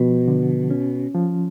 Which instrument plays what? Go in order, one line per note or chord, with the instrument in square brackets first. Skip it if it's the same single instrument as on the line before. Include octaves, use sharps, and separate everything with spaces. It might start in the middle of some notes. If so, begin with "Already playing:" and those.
Already playing: [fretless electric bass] B2 [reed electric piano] F3
[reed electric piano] D3
C#4
F3